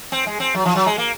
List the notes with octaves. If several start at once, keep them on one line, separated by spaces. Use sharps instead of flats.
C4
G#3
C4
F#3
F3
F#3
G#3
A#3